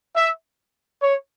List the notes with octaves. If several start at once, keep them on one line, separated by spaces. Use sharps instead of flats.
E5
C#5